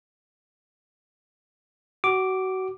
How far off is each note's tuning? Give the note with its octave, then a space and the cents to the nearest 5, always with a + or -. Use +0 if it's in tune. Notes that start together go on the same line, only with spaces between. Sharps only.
F#4 +25 D6 +0